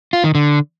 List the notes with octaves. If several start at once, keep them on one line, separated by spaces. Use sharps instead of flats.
F4
D#3
D3